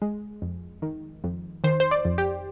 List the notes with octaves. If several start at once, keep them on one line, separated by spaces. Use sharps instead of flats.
G#3
F2
D#3
F2
D#3 C5
C5
D5
F2
G4